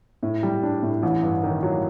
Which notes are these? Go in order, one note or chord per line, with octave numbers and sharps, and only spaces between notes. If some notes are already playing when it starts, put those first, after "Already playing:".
A2
G3
D4
A2
A1
G2
D#3
F#3